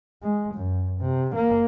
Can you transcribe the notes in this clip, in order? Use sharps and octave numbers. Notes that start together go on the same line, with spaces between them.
G#3
F#2
C3
A#3